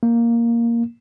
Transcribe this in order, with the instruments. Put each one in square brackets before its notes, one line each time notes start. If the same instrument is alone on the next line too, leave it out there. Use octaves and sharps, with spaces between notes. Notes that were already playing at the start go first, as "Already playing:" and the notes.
[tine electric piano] A#3